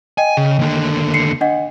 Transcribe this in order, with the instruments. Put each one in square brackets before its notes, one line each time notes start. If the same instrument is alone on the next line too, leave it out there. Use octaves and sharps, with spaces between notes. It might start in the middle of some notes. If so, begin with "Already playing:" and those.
[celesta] D#5 G5 [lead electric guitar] G#5
[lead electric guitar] C#3
D#2 D3
[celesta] C7 C#7
D4 D#5 F#5